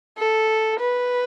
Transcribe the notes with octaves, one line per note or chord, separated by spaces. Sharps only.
A4
B4